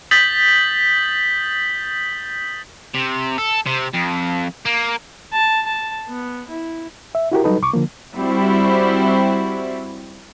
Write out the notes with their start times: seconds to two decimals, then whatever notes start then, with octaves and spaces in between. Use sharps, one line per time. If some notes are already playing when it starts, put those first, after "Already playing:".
0.11 D#6 G6 A6 B6 F#7 G7
2.95 C3
3.38 A4
3.66 C3
3.93 F2
4.66 A#3
5.33 A5
5.66 A5
6.08 B3
6.48 E4
7.15 E5
7.32 E4 F#4 G4 A#4
7.44 F#3 G3 D#4 A4 B4
7.62 C2 C#6 D6
7.73 D3 F3 A#3
8.15 G3 C4 E4 F#4